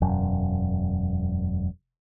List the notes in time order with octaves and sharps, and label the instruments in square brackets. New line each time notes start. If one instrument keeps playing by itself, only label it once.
[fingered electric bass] E1 F#2